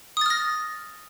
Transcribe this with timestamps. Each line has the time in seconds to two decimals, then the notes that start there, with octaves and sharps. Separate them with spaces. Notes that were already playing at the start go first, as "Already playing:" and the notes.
0.17 D#6
0.21 A6
0.26 F6
0.30 A#6